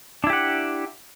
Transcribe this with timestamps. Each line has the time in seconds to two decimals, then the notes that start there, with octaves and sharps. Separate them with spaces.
0.24 D4
0.27 E4
0.30 G4
0.33 F#5